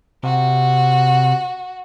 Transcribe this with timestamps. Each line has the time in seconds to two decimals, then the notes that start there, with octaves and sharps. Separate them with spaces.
0.23 C3 F#4